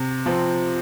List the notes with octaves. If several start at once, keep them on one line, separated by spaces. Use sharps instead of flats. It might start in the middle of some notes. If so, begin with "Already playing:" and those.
Already playing: C3
F3 C4